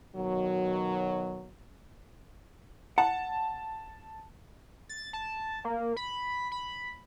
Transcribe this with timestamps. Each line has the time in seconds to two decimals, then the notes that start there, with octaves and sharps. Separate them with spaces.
0.16 B2 D#3 F#3
2.98 F#5 A5
4.89 A6
5.13 A5
5.65 A#3
5.97 B5
6.52 B5